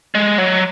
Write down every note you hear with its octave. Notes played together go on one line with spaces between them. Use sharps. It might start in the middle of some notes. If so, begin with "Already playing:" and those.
G#3
F#3